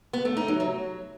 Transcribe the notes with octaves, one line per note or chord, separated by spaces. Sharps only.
B3
A3
D#4
F#3
F#3